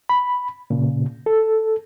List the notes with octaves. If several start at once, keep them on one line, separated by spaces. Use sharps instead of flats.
B5
A#2 C#3
A4